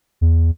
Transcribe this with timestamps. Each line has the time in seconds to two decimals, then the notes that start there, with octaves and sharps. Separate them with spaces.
0.21 E2